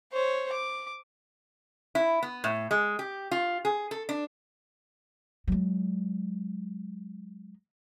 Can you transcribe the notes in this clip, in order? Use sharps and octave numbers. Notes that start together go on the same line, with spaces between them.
C5 C#5
D6
E4
B3
A2
G#3
G4
F4
G#4
A4
D4
F#3 G#3